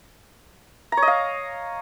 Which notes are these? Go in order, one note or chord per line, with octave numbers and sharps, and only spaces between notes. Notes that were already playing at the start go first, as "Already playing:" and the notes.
A#5
C#5
D#5
F5